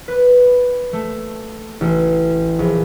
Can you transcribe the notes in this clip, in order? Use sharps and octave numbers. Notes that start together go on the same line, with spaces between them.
B4
A3
A1
A#1